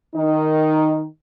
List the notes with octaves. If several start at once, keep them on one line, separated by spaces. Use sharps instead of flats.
D#3 D#4